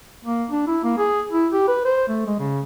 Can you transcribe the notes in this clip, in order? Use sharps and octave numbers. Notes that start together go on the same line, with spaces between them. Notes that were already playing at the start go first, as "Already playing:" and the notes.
A#3
D4
E4
A#3
G#4
E4
G4
B4
C5
A3
G#3
C#3